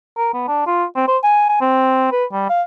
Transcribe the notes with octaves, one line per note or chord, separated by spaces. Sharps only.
A#4
B3
D4
F4
C4
C5
G#5
G#5
C4
B4
G3
F5